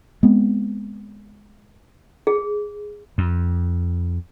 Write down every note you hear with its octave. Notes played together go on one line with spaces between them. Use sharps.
G#3 B3 C4
G#4
F2